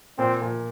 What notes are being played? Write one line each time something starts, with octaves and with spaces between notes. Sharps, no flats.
A#2 C4
A#2